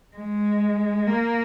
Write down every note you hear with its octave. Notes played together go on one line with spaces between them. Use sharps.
G#3
A#3